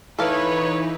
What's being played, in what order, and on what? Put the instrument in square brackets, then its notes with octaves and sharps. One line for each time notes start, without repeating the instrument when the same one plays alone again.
[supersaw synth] E3 D#4 E4 [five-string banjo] A4 F5 [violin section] B4 [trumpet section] C#5